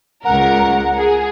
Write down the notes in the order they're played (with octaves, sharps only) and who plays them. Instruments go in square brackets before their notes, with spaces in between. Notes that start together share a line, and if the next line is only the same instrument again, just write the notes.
[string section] C#2 A#4 [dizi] F#5
[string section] G#4